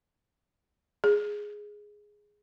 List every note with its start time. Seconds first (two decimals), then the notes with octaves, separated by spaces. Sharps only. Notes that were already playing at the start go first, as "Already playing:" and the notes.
1.04 G#4